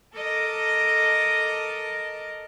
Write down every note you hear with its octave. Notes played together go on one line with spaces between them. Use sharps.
A4 A#4 D#5 A5 D6